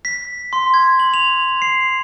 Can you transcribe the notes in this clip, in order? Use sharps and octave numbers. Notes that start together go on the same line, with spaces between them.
B6
C6
G#6
F#7
F7
C7